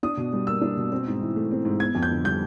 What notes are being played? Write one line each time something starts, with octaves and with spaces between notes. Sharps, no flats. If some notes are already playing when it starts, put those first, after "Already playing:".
D4 D#6
B2
G3
A#3 E6
D4
B2
C4
G#2
E3
A3
C4
G#2
B3 G#6
F2
G6
D3
G3 G6